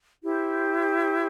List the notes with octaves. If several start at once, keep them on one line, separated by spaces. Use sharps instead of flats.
E4 G4 C5